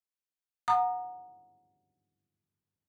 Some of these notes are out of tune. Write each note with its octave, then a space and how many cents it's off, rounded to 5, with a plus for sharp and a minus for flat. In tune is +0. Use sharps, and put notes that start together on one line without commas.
F#5 -20 A#5 +0 D#6 -30